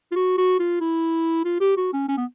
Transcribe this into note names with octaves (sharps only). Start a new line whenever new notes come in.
F4
F#4
F#4
F4
E4
F4
G4
F#4
C#4
C#4
B3